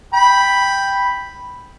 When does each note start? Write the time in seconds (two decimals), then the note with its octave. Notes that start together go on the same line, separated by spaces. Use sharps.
0.14 G5 B5